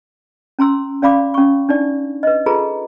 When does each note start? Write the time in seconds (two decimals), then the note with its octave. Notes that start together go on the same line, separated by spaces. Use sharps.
0.59 C#4 A#5 C6 E6
1.02 C#4 D5 F5 B5 D6
1.34 C#4 C#6
1.69 D4 D#4 D5
2.23 B4 D#5
2.46 F4 G#4 A4 B4 A#5